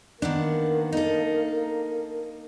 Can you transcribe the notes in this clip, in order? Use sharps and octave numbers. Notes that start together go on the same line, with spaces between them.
D#3 A#3 B3 D4 A#4
D#4 A4